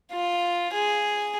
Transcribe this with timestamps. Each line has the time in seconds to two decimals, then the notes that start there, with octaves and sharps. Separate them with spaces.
0.12 F4
0.73 G#4